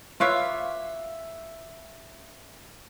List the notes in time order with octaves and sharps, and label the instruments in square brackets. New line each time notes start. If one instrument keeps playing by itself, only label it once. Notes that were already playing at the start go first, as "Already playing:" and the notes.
[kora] F4 B4 C#5 [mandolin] E5 F5 D6